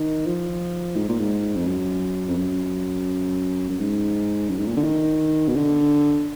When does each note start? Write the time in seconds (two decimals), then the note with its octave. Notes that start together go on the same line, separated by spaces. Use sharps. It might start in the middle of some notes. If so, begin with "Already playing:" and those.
Already playing: D#3
0.26 F3
0.96 G#2
1.09 A#2
1.20 G#2
1.55 F2
1.67 F#2
2.29 F2
2.38 F#2
3.70 F#2
3.79 G#2
4.49 F#2
4.58 G#2
4.67 A#2
4.77 D3
4.84 D#3
5.48 B2
5.55 D3